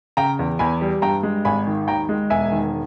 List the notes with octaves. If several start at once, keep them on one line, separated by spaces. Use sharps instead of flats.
C#3 G5 A#5
E2
E2 G#5 B5
G3
G2 G5 A#5
G#3
G#1 G#5 B5
D#3
D#2 G5 A#5
G#3
E1 E5 G#5
D#3